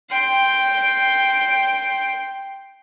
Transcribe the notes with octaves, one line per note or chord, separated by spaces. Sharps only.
G5 C6